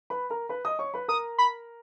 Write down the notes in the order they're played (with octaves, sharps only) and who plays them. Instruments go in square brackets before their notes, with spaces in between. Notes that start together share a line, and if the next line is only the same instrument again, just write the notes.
[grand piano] B4 B5
A#4 A#5
B4 B5
D#5 D#6
C#5 C#6
B4 B5
[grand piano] A#4 A#5 [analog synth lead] D#6
[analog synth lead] B5